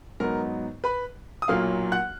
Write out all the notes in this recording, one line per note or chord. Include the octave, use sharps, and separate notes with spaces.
G#2 F#3 B3 D#4 A#4 A#5
B4 B5
D#6
B1 A#2 F#3 A#3 F5 F6
F#5 F#6